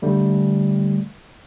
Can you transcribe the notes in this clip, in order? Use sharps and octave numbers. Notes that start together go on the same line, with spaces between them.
D3 G3 A3